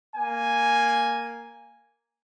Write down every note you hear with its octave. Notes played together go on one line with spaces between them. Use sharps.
A#3 G#5